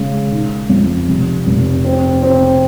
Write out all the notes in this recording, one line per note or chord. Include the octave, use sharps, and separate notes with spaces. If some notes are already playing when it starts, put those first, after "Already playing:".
Already playing: C#3 G#3
D#3
F2
F1
F1
C4
C4